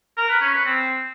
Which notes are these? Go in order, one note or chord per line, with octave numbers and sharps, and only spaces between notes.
A#4
B4
C#4
B4
C4